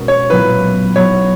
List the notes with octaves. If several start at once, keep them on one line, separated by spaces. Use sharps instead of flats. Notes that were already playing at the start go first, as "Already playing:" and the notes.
Already playing: B2 G#3 C#4 A#4
C#5
A#2 F#3 B3 E4 B4
B1 B2 F#3 B3 C#5